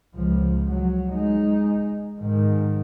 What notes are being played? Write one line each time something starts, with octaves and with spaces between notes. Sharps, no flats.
C#2 F3
F#3
G#3 D#4
G#2 D#3